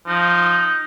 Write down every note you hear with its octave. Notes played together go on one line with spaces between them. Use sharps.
F3 D#4